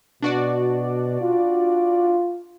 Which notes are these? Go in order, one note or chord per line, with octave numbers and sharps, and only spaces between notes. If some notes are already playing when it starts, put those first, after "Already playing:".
B2 D4 F#4 D5
F4